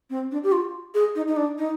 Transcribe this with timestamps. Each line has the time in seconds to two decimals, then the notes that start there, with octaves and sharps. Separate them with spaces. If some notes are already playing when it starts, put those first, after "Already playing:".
0.10 C4
0.31 D4
0.44 G4
0.52 F4
0.94 G#4
1.15 D#4
1.28 D#4
1.37 D4
1.58 D#4